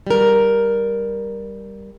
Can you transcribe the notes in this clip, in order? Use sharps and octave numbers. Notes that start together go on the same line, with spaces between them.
G3 A#4